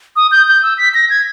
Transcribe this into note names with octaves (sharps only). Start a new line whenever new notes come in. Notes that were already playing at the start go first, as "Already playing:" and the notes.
D#6
G6
G6
E6
B6
A#6
G#6